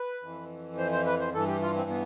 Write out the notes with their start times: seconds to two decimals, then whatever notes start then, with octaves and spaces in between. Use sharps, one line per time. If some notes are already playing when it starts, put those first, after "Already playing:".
Already playing: B4
0.23 F2 E3
0.78 C5
0.92 C5
1.06 B4
1.20 C5
1.34 G2 E3 A4
1.47 G4
1.62 F4
1.75 C4
1.90 B3